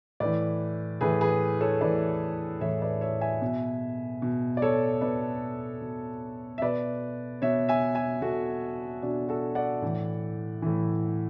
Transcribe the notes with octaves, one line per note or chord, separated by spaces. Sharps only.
A2 E3 B4 D5
A2 E3 G#4 B4
G#4 B4
A4 C#5
A2 E3 B4 D5
A2 E3 C#5 E5
B4 D5
C#5 E5
E5 G#5
B2
B2
D5
A4 C#5
B2 B4 D5
B2
E5
B2 B4 D5
B2 C#5 E5
E5 G#5
E5 G#5
B2 F#4 A4
B2 D4 F#4
F#4 A4
D5 F#5
A2 E3
A2 E3